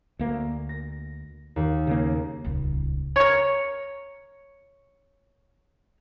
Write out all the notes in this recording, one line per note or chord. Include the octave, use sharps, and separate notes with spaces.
D2 A#3
A#6
D#2
C#3 A#3
D#1 C#2
A#4 C#5